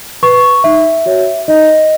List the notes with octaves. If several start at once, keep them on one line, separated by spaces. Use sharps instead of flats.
B4 C#6
D#4 E5
F#4 C#5
D#4 D#5